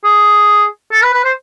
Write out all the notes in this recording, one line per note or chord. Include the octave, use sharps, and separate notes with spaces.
G#4
A4
B4
B4
C5